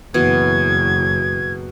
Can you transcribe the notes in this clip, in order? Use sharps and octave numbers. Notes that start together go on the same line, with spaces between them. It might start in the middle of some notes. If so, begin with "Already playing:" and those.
F#1 B2 E3 G#6